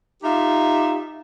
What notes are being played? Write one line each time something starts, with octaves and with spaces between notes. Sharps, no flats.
D#4 F4 G4 E5